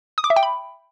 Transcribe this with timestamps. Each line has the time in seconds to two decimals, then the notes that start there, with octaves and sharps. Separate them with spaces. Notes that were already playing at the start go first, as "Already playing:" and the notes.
0.18 D#6
0.24 D6
0.30 E5
0.36 G5
0.43 B5